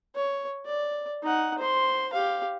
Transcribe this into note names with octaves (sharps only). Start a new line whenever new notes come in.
C#5
D5
D#4 F#5
C5 C6
G4 F5